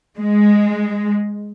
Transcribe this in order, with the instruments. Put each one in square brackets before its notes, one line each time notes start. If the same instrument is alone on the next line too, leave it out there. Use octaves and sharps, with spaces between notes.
[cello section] G#3